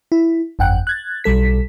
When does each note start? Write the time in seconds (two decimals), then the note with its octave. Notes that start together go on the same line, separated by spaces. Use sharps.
0.12 E4
0.59 G1 F2 F#5 G5 F#6
0.87 F#6 G#6 A6
1.24 B1 G3 A4 B6